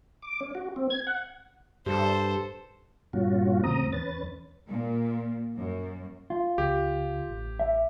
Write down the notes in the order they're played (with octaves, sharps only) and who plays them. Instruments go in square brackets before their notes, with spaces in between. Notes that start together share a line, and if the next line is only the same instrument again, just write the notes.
[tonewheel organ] D6
C#4
F#4
C4
G#6
F#5
[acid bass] G2 [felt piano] G4 [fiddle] A4 C5
[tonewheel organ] G2 A#2 C#4 F4 F#4
E2 A2 C#3 C4 A#5 D#6
E2 C#4 B4 A6
[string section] A#2
F#2
[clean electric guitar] F4
[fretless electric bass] C#2 [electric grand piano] G4
[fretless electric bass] A1
[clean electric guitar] E5